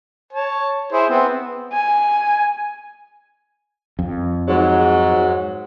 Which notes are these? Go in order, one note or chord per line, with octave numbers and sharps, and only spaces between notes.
C#5 A5
E4 G#4 C5
B3 C4
G#5
F2
G#2 F#3